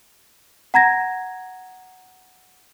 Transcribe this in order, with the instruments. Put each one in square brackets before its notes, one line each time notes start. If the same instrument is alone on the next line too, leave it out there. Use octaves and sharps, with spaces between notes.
[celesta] F#5 A#5 G#6 A#6